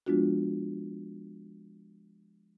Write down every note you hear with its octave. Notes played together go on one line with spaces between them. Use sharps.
F3 G#3 B3 D4 F4 F#4